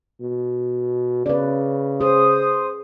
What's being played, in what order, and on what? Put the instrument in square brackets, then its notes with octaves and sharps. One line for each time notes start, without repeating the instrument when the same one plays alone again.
[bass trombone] B2
[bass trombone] C#3 [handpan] B4 D5
[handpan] G#4 [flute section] C5 C6 D#6